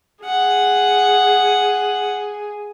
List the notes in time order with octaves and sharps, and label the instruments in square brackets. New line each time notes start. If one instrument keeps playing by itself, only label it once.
[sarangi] G#4 [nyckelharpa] F#5